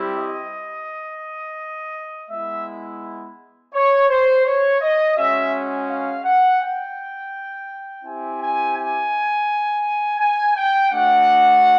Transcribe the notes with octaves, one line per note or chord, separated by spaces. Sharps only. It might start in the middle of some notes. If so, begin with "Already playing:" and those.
Already playing: G3 C4 E4 G4
D#5
G#3 B3 E4 E5
C#5
C5
C#5
D#5
G#3 C#4 F#4 E5
F5
F#5
G5
C4 E4 G4 G#5
G#5
G#5
G#5
G5
A3 D4 F#4 F#5